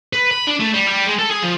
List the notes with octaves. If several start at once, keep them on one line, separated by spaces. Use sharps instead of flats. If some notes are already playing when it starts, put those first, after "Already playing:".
B4
B5
D4
A3
G3
G3
G#3
A4
G#4
F3